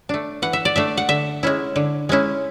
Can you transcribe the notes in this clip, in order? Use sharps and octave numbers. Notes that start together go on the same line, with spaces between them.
A3 D4
E3 F#5
E5
D5
A3 D4 E5
F#5
D3 E5
G#3 C#4 E4
D3
G#3 C#4 E4